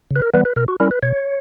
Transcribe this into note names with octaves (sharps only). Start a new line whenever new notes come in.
C#3 B4
A#4
E3 G3 B3 B4
B4
B2 A#4
F#4
G3 C#4 E4 A#4
B4
B2 C#5